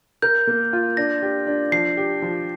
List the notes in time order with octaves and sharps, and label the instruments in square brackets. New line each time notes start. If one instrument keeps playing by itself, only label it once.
[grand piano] A#4 [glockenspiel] G6
[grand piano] A#3
F4
[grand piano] D4 [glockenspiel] A#6
[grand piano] G4
D4
[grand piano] F3 [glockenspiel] C7
[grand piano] G4
F3